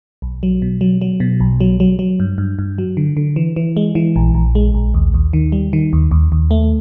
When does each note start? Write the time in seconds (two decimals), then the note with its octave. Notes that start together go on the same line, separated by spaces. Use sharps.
0.22 B1
0.43 F#3
0.62 B2
0.81 F#3
1.01 F#3
1.20 B2
1.40 B1
1.60 F#3
1.80 F#3
1.99 F#3
2.20 G2
2.38 G2
2.59 G2
2.78 F#3
2.97 D3
3.17 D3
3.36 E3
3.56 E3
3.77 G#3
3.95 E3
4.16 A#1
4.34 A#1
4.55 G#3
4.74 A#1
4.94 D#2
5.14 D#2
5.33 D#3
5.52 G3
5.73 D#3
5.93 D#2
6.11 D#2
6.32 D#2
6.51 A3